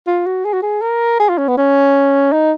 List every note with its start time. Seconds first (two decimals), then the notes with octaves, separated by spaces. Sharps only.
0.07 F4
0.26 F#4
0.45 G#4
0.53 F#4
0.62 G#4
0.82 A#4
1.20 G#4
1.29 F4
1.38 C#4
1.48 B3
1.57 C#4
2.32 D#4